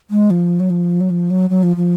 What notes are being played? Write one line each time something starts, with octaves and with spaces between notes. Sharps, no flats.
G#3
F3
F#3
F3
F#3
F3
F#3
F#3
F3
F3